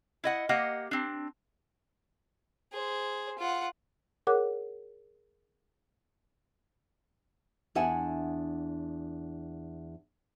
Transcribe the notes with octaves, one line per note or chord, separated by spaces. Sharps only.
E4 D#5 F#5
A#3 G4 D#5 F#5
C4 D4
G#4 C5
F4 F#5
G#4 A#4 C#5 F#5 D6 F#6
E2 D4 E5 F#5 G#5